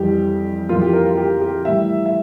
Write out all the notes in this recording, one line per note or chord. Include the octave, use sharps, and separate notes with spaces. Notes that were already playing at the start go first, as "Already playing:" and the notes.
Already playing: F2 E3 G3 G4
F2 E3 A#3 F4
G4
A#4
F4
G4
G4
A2 E3 G3 E5
E5